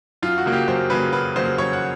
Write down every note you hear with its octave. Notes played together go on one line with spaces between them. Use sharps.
F#2 F4
F#4
C#3 F#3 A#3
G4
F#2 C5
C#3 F#3 A#3 B4
F#2 B4
C#3 F#3 A#3 C5
F#2 C#5
F#5